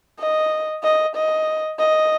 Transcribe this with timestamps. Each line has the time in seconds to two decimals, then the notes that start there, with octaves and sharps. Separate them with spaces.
0.19 D#5
0.84 D#5
1.16 D#5
1.79 D#5